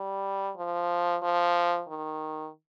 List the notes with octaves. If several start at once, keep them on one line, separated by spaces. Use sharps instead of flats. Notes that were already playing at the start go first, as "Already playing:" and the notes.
Already playing: G3
F3
F3
D#3